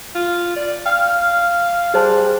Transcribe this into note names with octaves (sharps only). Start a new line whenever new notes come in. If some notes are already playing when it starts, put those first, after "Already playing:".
F4
D5
F5 G5 F6
G3 G#4 C5 A5